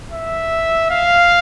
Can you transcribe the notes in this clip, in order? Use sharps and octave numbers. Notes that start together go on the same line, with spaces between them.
E5
F5